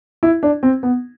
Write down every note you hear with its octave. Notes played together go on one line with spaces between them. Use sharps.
E4
D4
C4
B3